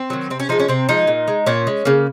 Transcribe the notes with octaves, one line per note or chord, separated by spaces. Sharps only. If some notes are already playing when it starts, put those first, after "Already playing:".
Already playing: C4
D#3 F#3
C3 C4
C#4
F3 G#3 D#4
C#4
C3 C4
F3 G#3 D#4
A#2
G#3
A#2 C#4
G#3
C#3 A#3